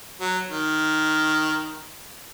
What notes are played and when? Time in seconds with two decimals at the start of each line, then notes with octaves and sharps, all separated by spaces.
0.21 F#3
0.49 D#3